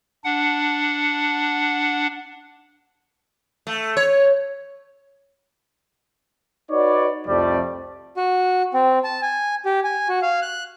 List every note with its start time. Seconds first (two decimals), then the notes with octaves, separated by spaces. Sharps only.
0.25 D4 F#5
3.67 A3
3.97 C#5
6.70 D#4 F#4 B4 C#5 D5
7.26 C2 F2 F3 G3 A3 D5
8.17 F#4
8.74 C4
9.04 A5
9.22 G#5
9.66 G4
9.84 G#5
10.09 F#4
10.22 F5
10.42 F#6